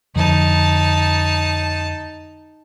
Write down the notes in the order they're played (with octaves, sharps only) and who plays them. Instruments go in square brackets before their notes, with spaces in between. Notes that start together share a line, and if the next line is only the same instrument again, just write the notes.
[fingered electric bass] F2 D3 [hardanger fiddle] D#4 A5